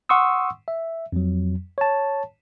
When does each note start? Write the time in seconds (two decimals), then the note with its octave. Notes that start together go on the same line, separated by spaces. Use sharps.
0.09 F#5 C6 C#6 D#6 E6
0.68 E5
1.12 F2 F#3
1.78 C#5 A5